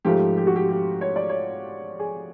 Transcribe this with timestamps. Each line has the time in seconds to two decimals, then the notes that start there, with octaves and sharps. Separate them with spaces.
0.05 G#2 F3 A3 G4
0.37 G4
0.47 F#4
0.56 G4
0.69 G4
1.01 C#5
1.16 D5
1.29 C#5
1.99 G#4